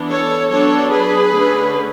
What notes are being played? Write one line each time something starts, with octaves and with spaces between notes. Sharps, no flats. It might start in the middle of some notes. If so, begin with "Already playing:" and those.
Already playing: E3 B3 D4
A4 C#5
F#3 B3 D4 A4 C#5
G#4 B4
D3 A3 C#4